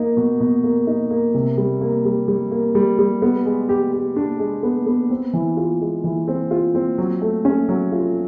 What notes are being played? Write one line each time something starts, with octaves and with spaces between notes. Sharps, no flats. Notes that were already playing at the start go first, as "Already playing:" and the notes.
Already playing: A#3 D#4
B2
B2
A#3
D#4
A#3
C3
G3
A#3
G3
G3
A#3
G3
G3
B3
G#3
G4
G4
D4
G#3
B3
B3
C4
E3
F4
G#3
E3
C4
F4
C4
F#3
A3
C#4
F#3
F4